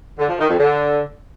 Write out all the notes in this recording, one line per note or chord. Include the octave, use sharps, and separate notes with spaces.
D3
F3
D#3
F2
D3